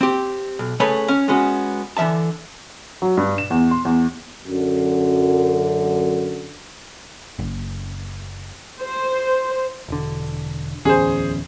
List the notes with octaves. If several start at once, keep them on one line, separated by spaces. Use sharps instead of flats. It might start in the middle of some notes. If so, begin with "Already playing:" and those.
C4 G4
B1
C#3 A3 G#4 B4 C#5
C#4
G#3 B3 C#4 F#4
D3 E3 F#3 E5 A5
F#3
G2
E7
E2
C6
E2
F#2 D3
F#1
C5
E1 D3
D1 E2 C#4 G#4 C5